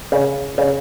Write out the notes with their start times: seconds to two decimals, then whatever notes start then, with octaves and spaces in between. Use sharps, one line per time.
0.12 C#3
0.58 C#3